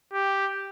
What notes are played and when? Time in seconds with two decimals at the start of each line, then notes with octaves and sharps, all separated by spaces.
0.13 G4